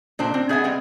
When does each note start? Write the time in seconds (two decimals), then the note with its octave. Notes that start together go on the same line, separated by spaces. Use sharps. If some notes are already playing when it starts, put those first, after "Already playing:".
0.19 A#2 D4 C5
0.34 C4
0.49 B3 G#4 E5 G5 G#5
0.64 G3 B3 C4